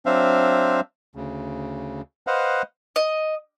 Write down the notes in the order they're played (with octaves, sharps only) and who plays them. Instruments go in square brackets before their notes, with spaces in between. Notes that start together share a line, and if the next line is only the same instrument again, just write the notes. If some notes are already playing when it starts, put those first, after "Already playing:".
[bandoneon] F#3 C4 D4 C5 E5 F5
D2 C#3
B4 C5 D#5 F5 F#5
[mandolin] D#5